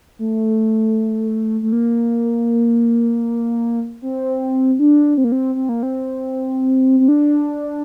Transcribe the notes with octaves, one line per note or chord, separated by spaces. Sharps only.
A3
A3
A#3
C4
D4
C4
A#3
C4
C4
A#3
C4
C4
D4